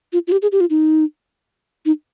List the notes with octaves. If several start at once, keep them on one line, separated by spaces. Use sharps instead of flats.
F4
F4
G4
G#4
G4
F4
D#4
D#4